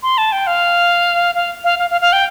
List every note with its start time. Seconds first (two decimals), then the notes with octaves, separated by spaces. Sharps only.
0.03 C6
0.18 A5
0.32 G5
0.47 F5
1.35 F5
1.64 F5
1.79 F5
1.90 F5
2.01 F5
2.13 G5